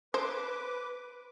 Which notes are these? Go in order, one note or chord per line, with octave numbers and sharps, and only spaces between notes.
B4 C5 D6